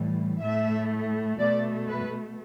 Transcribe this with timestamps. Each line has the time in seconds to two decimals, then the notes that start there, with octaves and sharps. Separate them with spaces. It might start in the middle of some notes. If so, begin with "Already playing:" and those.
Already playing: A2 E3 G3
0.41 A2 A3 E5
1.39 B2 A3 D5
1.89 B4